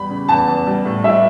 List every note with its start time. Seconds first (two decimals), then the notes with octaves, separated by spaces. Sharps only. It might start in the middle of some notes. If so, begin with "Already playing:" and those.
Already playing: E2 G3 B5
0.09 C#3
0.28 E2 A5
0.48 E2
0.67 G3
0.85 A2
1.04 G3 E5